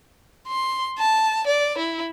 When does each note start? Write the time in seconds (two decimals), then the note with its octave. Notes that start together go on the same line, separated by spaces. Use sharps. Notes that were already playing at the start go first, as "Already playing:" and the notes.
0.47 C6
0.99 A5
1.47 D5
1.78 E4